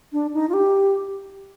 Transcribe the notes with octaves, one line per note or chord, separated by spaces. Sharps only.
D4
D#4
F4
G4